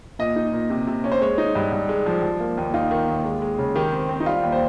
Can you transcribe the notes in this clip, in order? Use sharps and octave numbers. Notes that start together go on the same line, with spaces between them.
A#2 D#5
D#4
A#2
C3
C3
C#4
C5
G#3 C#5
D#4
G2
G2
G#3
F3
F3
A#3
D#2
D#4 F4
D#3
D#2
G#3
G#3
C#3
D#3 G4
C4
C4
D#4
G3 F4
D#2
C5